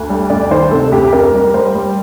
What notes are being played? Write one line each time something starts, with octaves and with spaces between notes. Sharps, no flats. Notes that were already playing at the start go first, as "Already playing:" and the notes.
Already playing: D2
G3
D2 D5
D#3 C5
C3 A4
D2 G4
F2 A#4
G3
G3 C5
G3